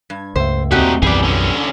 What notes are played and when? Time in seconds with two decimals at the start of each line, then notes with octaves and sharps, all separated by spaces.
0.10 G2 G#6
0.36 C#2 G2 A3 C5 E5
0.71 D#2 A#2 A3 C4 D#4 F#4 G4
1.03 B1 F#2 E3 G3 B3 G#4 D5
1.23 D3 C#4